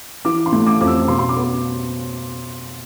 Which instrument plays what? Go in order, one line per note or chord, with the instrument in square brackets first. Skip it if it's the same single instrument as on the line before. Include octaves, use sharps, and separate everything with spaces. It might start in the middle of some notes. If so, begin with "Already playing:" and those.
[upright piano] E3 D6
C6
A3
D6
F2 D6
E6
B2 C6
C6
D6
B3